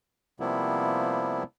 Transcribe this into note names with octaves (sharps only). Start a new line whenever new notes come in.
C3 F3 G3 A#3 B3 E4